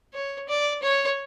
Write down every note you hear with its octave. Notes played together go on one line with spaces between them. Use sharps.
C#5
D5
C#5